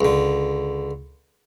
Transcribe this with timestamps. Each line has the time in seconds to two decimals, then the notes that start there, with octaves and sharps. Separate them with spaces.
0.01 C#2 D3